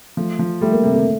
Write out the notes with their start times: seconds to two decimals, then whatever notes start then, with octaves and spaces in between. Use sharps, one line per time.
0.17 F3 A3
0.39 F3
0.61 G3 A3
0.72 A#3
0.83 C3 A3
0.94 A3